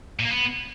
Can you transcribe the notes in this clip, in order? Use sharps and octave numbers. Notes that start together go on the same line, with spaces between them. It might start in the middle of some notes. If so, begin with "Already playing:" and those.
A#2
A#3
B3